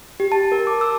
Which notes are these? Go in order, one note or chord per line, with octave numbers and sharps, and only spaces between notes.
G4
A5
A#4
D6
E6